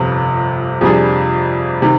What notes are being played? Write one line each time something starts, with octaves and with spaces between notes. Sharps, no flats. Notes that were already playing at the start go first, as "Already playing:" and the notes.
Already playing: G1 F2 C3
F2 C3 G3 D4 G#4
C3 D#3